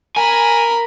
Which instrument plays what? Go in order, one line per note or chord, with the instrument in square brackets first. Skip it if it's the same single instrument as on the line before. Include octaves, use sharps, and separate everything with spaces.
[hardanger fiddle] A#4 B5 [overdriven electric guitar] G#5